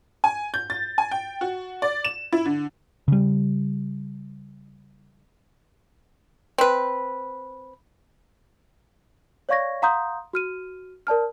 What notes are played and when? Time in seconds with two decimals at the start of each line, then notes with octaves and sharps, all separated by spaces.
0.24 G#5
0.54 G6
0.70 A6
0.98 G#5
1.11 G5
1.41 F#4
1.82 D5
2.05 E7
2.33 E4
2.46 D3
3.08 C#3 G3
6.58 C4 B4
9.49 C#5 D5 F5 C#6 G#6 A#6
9.82 F5 F#5 A#5 C6 D#6 G6
10.33 F#4 F6 D#7
11.07 A#4 D5 A5 F6